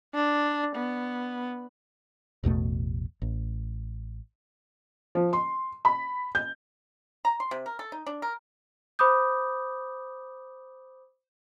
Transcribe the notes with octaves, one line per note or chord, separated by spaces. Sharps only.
D4
B3
A1 E2 B2 A3
A1
F3
C6
B5
G6
A#5
C6
C3
A#4
A4
D#4
D4
A#4
C5 B5 D6 D#6 G6